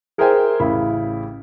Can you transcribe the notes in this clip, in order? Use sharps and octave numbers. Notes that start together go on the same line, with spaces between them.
G#4 A#4 C5 E5 G5 G#5
A1 C#3 E4 B5